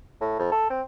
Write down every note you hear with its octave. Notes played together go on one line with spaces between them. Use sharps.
A2
F2
A4
C4